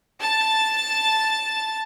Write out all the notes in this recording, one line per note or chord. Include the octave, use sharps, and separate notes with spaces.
A5 A6